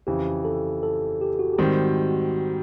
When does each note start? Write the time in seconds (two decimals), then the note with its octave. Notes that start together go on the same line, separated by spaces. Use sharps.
0.07 F2 C#3 E3 G4
0.45 A4
0.83 A4
1.21 G4
1.39 F#4
1.53 G4
1.58 G#2 D#3 G3 C4 F#4
1.83 F#4
2.09 F#4
2.34 F#4